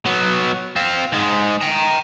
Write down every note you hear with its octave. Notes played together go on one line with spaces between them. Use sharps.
F#3 B3
C4 F4
G#2 G#3
G5 A#5